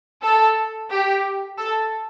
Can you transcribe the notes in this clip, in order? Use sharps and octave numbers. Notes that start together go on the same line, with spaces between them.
A4
G4
A4